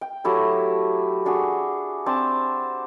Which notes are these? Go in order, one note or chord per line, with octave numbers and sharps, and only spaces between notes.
G5
F#3 A3 E4 G4
D4 F#4 G#4
C4 D4 A5